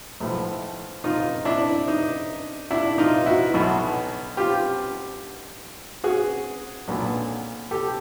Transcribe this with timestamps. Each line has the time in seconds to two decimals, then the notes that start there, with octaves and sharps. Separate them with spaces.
0.20 B1 A2 F3 A3
1.04 D#4 F4
1.45 D4 E4
1.88 D#4
2.71 D4 E4
2.98 D#4 F4
3.26 E4 F#4
3.54 B1 B2 F#3
4.37 F4 G4
6.04 F#4 G#4
6.88 B1 A#2 F#3 B3 D4
7.71 G4 A4